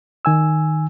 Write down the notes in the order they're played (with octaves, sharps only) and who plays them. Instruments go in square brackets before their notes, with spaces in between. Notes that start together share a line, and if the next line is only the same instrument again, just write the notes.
[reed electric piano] D#3 G#5 E6